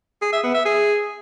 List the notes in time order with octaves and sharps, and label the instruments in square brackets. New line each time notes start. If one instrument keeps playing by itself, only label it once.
[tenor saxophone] G#4
E5
B3
E5
G#4